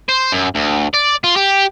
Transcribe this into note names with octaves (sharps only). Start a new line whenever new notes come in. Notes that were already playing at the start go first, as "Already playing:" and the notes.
C5
F#2
D2
D5
F4
G4